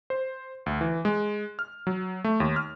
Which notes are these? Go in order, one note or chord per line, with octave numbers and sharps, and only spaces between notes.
C5
D2
E3
G#3
F6
F#3
A3
D#2
F6